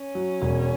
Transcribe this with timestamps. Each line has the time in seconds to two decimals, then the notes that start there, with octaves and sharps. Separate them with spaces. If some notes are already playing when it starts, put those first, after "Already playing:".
Already playing: C#4
0.15 F#3
0.41 E1